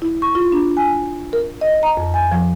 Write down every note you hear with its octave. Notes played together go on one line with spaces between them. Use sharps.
E4
C#6
F4
D4
G#5
A#4
D#5
A#5
F2
G#5
F3